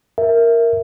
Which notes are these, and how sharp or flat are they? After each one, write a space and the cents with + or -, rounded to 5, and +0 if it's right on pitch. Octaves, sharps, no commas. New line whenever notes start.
A#4 -5 E5 +0